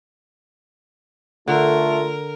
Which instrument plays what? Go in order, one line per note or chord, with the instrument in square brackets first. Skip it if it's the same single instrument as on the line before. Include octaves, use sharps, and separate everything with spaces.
[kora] D3 [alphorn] A3 [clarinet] F4 [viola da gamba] A#4